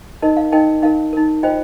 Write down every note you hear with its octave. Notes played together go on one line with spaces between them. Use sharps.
D#4 A#4 D#5
F5
D#4 A#4 D#5 G5
D#4 A#4 F5
D#4 A#4
F4 C5 D#5 G5